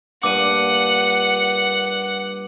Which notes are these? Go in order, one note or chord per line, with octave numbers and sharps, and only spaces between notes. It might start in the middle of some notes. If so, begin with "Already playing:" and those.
G2 A#2 F#5 D6 D#7